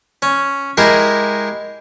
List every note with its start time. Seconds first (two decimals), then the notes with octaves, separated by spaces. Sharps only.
0.22 C#4
0.77 G#3 E4 G4 G#4 A#4